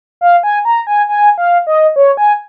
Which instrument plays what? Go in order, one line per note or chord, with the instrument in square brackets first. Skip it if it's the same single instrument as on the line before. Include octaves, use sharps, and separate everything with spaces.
[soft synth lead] F5
G#5
A#5
G#5
G#5
F5
D#5
C#5
G#5